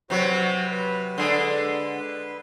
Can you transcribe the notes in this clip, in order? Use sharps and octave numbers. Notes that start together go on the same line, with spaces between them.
C3 F#3 F#4 B4 C#5
B4
D3 G#3